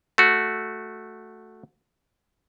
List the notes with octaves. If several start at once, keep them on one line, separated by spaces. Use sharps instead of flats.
A3 F#4